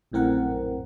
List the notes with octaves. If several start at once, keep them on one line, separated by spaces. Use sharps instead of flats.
A#1 F#2 A2 C4 A#4 F#5